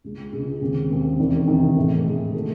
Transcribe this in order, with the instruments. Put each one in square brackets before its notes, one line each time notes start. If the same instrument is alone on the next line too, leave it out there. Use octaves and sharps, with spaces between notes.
[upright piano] C#2 C#3 G#3
C#2 C#3 G#3
D#2 C#3 G#3 C4
D#2 C#3 G#3 C4
E2 C3 D#3
E2 C3 D#3
A2 E3 G#3
A2 E3 G#3
D#3 A3 D#4 F#4